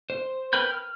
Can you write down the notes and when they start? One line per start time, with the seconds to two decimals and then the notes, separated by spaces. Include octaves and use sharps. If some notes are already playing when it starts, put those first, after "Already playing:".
0.10 C5
0.53 A#4 B4 G5 B5 G6
0.71 F6